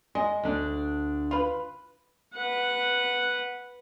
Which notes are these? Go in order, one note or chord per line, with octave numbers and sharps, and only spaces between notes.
G#3 D#5
D2 D4
F4 B4
B4 F#5